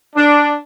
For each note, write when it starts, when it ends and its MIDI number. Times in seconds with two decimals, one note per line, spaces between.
0.16 0.54 62